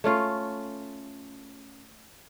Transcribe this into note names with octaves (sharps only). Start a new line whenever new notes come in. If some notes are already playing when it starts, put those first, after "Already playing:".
A3 C#4 F4